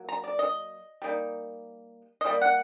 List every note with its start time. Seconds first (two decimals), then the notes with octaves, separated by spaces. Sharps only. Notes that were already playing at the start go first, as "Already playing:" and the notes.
Already playing: F#3 A#3
0.09 A#5
0.24 D5
0.39 D#5
1.02 G3 A#3 D#4
2.21 D#5
2.26 G3 A#3
2.42 F#5